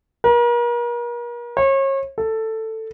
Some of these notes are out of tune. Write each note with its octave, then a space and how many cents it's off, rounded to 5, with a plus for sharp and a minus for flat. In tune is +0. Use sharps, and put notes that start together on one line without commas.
A#4 +40
C#5 -35
A4 +10